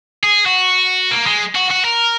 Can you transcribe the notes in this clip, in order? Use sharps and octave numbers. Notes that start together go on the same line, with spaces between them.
G#4
F#4
A#3
G#3
F#4
F#4
A#4